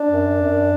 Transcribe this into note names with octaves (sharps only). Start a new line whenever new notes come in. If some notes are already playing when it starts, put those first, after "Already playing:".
Already playing: D4
F#2
F#2